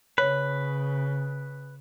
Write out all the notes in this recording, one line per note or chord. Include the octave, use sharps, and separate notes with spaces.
C#3 B4 C#5